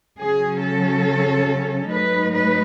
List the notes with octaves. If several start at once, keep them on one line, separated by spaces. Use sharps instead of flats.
C#3 F#3 C#4 G#4
A4
G#2 F#3 A3 D#4 B4
B4